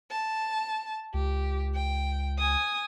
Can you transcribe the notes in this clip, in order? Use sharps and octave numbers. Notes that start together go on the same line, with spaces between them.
A5
C#2 G4
G5
G#5 D#6